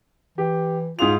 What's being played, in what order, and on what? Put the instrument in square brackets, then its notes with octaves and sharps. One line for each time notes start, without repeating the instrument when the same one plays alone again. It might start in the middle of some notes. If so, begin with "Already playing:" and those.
[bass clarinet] E3 [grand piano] G4
[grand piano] G#2 G#4 F7 [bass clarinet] F4